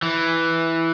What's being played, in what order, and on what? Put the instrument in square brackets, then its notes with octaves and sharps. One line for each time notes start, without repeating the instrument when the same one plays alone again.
[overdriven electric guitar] E3